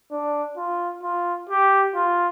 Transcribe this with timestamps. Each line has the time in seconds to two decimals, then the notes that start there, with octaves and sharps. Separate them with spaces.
0.11 D4
0.57 F4
1.03 F4
1.50 G4
1.95 F4